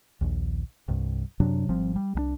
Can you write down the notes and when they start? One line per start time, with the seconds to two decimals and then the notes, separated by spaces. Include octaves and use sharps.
0.21 A#1 D#2
0.88 C2 G2
1.40 F#2 C3 F#3 D4
1.69 G#1 F3 G3 C4
1.96 G3
2.15 C2 G3 D4